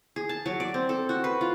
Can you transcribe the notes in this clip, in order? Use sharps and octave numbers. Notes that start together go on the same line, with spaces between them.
G#4
A5
F#3
D5
C4
A4
F#4
B4
F4